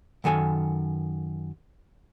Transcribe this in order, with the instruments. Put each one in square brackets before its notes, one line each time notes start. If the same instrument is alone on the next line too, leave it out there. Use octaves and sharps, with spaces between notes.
[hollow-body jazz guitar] F#2 D#3 A4 G#5